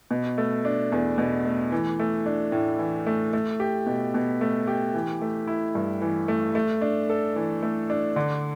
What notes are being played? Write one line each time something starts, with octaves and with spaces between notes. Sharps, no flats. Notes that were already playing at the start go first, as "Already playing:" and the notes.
B2
A3
D4
E2
B2
A3
E3
A3
D4
A2
E3
A3
A3
G4
B2
B2
A3
G4
E3
A3
E4
G2
E3
A3
A3
D4
A4
E3
A3
D4
D3